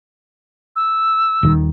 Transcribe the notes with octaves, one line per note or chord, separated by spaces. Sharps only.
E6
D#1 D#3